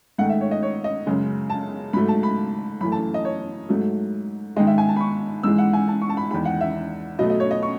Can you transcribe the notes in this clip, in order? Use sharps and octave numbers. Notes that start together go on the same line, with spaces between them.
G#2 D#3 A3 F#5
E5
C#5
D#5
C#5
D#5
F#2 C#3 G#3
A5
G#2 F#3 A3 B5
A5
B5
F#2 E3 A3 B5
A5
D#5
C#5
G#2 F#3 A3
G#2 D#3 G#3 D#5
E5
G#5
A5
B5
C#6
G#2 E3 G#3 E6
F#5
G#5
A5
C#6
A5
B5
E2 D#3 G#3 B5
F#5
E5
B2 F#3 A3 D#5
D#5
C#5
D#5
C#6